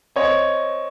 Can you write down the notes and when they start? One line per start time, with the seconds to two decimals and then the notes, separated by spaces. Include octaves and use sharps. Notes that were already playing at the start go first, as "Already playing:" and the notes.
0.16 C4 C#5 D#5